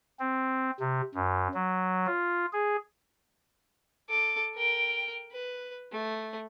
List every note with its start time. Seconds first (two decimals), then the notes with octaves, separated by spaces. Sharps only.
0.19 C4
0.80 C3
1.14 F#2
1.54 F#3
2.06 F4
2.53 G#4
4.09 A4 D6
4.56 A#4 G5
5.32 B4
5.92 A3